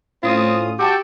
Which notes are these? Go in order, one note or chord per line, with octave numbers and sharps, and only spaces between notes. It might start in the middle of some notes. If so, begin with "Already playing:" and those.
A2 C4 C#4 F4 D#6
F#4 G4 G5 A5 E6